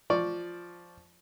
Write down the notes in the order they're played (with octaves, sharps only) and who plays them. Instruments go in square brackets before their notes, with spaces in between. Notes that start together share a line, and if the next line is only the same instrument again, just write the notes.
[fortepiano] F3 D5 C#6